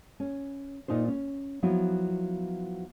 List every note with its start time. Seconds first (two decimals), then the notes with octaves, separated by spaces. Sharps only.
0.20 C#4
0.88 A#2 D#4 F4 C5
1.08 C#4
1.63 F3 F#3 B3 E4 F#4